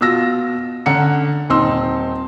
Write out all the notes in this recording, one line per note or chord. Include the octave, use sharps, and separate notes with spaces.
B2 F4 E6 A#6
D3 C#4 F#5 A#5 C#7
D#1 C4 D#4 C6 E6